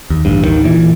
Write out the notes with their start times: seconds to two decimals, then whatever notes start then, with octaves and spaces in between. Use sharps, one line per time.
0.10 D#2
0.25 A1 G2
0.45 A1 D#2 D#3
0.64 A#2 E3